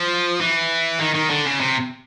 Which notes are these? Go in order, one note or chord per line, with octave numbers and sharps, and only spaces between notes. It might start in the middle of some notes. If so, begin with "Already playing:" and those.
Already playing: F3
E3
D#3
D#3
D3
C#3
C3